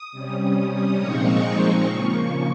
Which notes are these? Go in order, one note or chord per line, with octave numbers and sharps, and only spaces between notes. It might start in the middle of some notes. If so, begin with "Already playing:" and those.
Already playing: D#6
C3 G3 C#4
A#2 F3 G#3 C4 D#4 C#6
C#3 F3 A#3